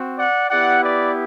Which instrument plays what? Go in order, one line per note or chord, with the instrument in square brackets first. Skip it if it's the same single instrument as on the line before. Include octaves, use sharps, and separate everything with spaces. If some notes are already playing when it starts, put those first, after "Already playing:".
Already playing: [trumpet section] C4 F#4
D5 F#5
B3 E4 G4 D5 F#5
B4 D5